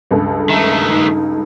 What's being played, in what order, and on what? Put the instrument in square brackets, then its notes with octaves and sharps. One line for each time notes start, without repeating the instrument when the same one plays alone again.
[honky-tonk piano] C#2 G2 A4
[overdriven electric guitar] D#3 A3 [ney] E5
[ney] D#4